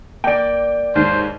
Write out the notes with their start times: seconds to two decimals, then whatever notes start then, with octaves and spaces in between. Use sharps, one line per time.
0.24 A#3 D5 G5 D7
0.95 D#2 G#2 C5